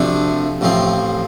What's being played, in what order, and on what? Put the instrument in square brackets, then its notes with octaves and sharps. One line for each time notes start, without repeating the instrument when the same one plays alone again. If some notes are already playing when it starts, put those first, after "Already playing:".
Already playing: [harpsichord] D2 C3 F3 A3 D4
A1 A2 F3 C4